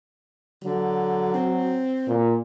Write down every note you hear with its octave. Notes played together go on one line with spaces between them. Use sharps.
D3 F#3
C4
A#2